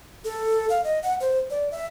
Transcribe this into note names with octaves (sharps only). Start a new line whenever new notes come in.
A4
F5
D#5
F#5
C5
D5
E5